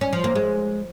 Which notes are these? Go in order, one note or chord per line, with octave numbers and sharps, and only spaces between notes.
C#4
F3
A#3
G#3